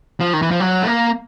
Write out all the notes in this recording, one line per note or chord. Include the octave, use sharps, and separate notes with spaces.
F3
D#3
E3
F3
F#3
A3
A#3